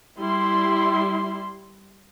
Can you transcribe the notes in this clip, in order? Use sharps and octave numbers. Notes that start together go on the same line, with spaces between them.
G3 E4 C6